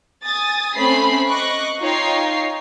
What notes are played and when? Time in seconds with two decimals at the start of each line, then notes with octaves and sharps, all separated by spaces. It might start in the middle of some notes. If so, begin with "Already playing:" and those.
0.24 G#5 D#6 A6
0.76 A3 C4 C#4 B5 B6 C7
1.29 D#5 C#6 D6 F#6
1.81 D#4 F4 C#5 G5 C7